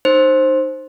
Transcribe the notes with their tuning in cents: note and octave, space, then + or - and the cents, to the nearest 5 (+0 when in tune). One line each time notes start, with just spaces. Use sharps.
D#4 -20 C5 +15